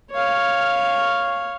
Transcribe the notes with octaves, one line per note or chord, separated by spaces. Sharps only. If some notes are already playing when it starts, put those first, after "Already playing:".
C#5 F5